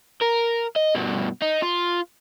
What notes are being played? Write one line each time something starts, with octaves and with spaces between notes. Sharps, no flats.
A#4
D#5
G2 B2
D#4
F4